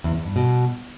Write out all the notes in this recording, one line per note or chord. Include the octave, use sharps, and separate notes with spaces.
E2
E2
G2
B2